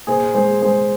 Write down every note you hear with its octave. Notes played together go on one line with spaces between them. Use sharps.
A#2 G#4 C5
G#3 G#4 C5
G#3 G#4 C5